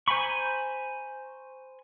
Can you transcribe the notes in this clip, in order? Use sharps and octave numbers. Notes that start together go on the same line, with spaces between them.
C5 G#5 A#5 B5 C#6